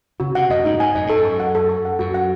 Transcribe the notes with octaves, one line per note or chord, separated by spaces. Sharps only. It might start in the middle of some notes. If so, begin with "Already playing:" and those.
C#3 F#4
C3 F#5
F#2 D#5
G#2 D#4
G#2 G#5
F#2 D#5
G#2 A4
F#2
C#6
F#5
A4
C#6
F#5
F#2 F#4
F#5